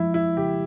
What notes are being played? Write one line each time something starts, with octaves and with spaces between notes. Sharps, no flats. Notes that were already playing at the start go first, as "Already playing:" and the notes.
Already playing: F2 F3 G#3 E4
E4
C#3 G4